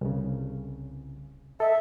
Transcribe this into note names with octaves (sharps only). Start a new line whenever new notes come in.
C2 C#3
A4 D#5 E5